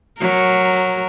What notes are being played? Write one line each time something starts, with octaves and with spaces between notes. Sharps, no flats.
F#3 A#4